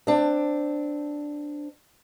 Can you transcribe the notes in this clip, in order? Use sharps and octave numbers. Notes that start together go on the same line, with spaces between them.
C4 D4